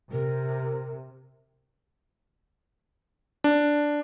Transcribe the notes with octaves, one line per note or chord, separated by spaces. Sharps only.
C3 A#4
D4